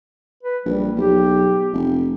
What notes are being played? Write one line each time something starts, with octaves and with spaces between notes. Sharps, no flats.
B4
A#1 G3
B1 G4
F1